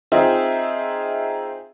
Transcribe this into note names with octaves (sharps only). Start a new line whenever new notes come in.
C4 D#4 F4 G#4 E5